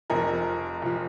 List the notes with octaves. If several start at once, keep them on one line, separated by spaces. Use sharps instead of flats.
F1 F2 F3 A#4
F1 F3